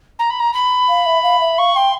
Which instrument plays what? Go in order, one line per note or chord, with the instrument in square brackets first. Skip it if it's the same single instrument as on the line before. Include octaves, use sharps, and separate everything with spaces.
[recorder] A#5
B5
A#5
B5
[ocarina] F5
E5
F5
E5
[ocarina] F5 [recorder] C#6
[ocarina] G5 [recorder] C6